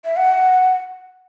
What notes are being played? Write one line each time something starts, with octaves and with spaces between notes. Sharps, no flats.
E5
F#5